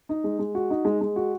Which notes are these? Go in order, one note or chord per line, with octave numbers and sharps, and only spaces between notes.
D#4
G#3
G#3
F#4
D#4
G#3
G#3
F#4